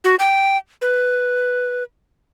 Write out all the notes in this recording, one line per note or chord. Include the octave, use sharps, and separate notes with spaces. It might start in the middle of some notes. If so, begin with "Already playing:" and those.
F#4
G5
B4